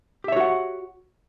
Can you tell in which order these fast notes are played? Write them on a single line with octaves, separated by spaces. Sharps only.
G4 E5 C#5 F#4 F#5